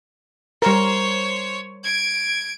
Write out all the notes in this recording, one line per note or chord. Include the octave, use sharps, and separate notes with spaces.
G3 A#4 C5 C#5
G#6 D7